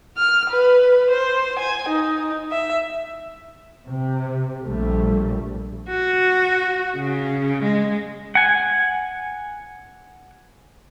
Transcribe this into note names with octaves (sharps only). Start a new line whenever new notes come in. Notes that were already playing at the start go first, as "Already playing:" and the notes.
F6
B4
C5
G#5
D#4
E5
C3
A#1 A#2 G3 A3
F#4
C#3
G#3
F#5 G#5